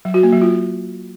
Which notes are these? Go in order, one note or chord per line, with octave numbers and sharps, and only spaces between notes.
F#3
F#4
A#3
F#3
F4